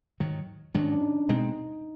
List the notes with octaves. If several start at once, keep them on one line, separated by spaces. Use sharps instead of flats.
G#2 D#3 F#3
G#2 D#3 F#3 D4
C#4
D4
D#4
B2 G#3 C4 D#4